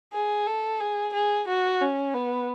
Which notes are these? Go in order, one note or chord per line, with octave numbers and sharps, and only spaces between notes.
G#4
A4
G#4
G#4
F#4
C#4
B3